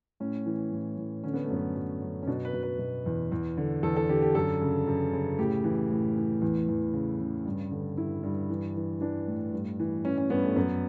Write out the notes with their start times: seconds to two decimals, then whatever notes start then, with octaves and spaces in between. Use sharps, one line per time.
0.20 A2 C#4
0.46 E3
0.72 A2
0.98 A2
1.24 D3 C#4
1.34 B3
1.44 A3
1.50 F#2 B3
1.76 F#2
2.02 F#2
2.23 C#4
2.27 B2 D4
2.45 B4
2.54 B2
2.63 B4
2.79 B2
3.06 E2
3.32 E2
3.57 D3
3.83 E2 A4
3.97 A4
4.09 D3 G4
4.22 G4
4.35 F#2 A4
4.61 C#3
4.87 F#2
5.13 C#3
5.39 A2 G4
5.64 E3
5.91 A2
6.17 E3
6.42 E2
6.69 E2
6.93 C#3
7.20 C#3
7.45 G2
7.71 D3
7.98 G2 E4
8.23 G2
8.50 E3
8.76 E3
9.01 E3 D4
9.28 A2
9.52 G2
9.79 E3
10.05 E3 C#4
10.18 C#4
10.30 G2 B3
10.43 A3
10.56 F#2 B3